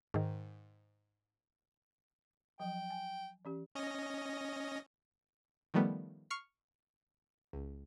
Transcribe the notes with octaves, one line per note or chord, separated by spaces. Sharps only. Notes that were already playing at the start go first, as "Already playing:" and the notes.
G#2 D#3
F3 F#3 G5
G#5
E3 C#4 G4
C#4 D#5 A#6
D#3 F3 G3 A3 B3
C#6 F6 C7
C#2